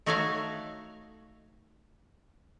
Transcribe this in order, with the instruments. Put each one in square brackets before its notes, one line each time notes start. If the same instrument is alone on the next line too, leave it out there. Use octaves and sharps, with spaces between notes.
[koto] A3 D#4 F#4 C#5 E5 F5